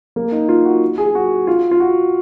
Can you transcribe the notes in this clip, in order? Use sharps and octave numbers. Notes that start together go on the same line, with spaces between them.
A#3
D#4
F4
F#4
G#4
F#4
F4
F4
F#4